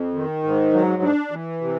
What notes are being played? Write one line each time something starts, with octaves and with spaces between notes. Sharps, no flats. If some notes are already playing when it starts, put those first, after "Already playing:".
Already playing: F2
D#3
G#2
F#3
D4
E3
C3